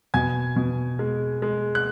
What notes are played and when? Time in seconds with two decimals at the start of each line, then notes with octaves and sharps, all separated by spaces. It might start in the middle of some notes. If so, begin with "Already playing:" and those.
0.14 B2 G#5 G#6
0.56 B2
0.99 G#3
1.42 G#3
1.75 F#6